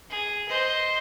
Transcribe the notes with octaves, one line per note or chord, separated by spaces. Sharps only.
G#4
C5 D#5